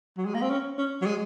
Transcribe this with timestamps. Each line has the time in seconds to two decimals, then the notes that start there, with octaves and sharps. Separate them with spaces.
0.17 F#3
0.25 G#3
0.34 A#3
0.42 C4
0.50 C#4
0.78 C#4
1.02 F#3
1.06 G#3